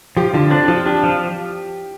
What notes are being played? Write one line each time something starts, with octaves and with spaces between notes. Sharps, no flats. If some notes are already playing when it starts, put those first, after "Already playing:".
F3 G4
D3 F4
C4 D4
F3 F4
D4 G4
F3